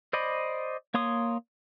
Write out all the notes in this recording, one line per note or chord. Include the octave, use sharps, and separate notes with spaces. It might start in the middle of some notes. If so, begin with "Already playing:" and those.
C5 D5 D#5 B5
A#3 C#5 C6 D#6